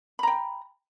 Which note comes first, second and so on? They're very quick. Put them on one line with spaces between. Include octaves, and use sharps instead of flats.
B5 A#5 G5